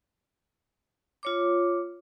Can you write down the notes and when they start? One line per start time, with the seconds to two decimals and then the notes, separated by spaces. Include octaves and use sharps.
1.23 F4 C#5 D6